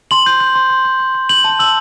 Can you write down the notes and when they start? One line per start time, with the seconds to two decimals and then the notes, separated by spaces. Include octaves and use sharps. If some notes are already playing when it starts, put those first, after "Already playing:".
0.11 C6 F#7
0.26 G6
0.40 G6
0.55 C6
0.70 C6
0.85 G6
1.00 G6
1.15 C6
1.29 G6 F#7
1.44 A5 F#7
1.59 E6 F#7